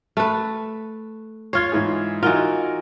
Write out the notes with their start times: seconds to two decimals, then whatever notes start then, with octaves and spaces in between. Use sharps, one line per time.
0.17 A3 B4
1.53 F4 C#5 G#6 C7
1.72 G#2 E3 G#4
2.23 E3 D#4 F4 F#4 A#4